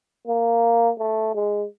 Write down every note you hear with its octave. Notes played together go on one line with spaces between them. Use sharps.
A#3
A3
G#3